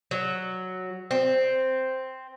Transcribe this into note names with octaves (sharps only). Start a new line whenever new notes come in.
F#3
C4